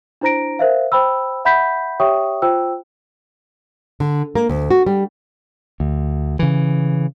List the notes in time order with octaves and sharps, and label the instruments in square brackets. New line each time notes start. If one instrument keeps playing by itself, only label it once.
[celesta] D4 E4 C5 A#5 A#6 D7
A#4 C5 E5 F5
C5 G5 B5 E6
E5 F#5 B5 G6 B6
G4 C#5 E5 G5 C#6 D#6
F4 C5 G5 E6
[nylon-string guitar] D3
A#3
D2
F#4
G3
[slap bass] D2
C#3 E3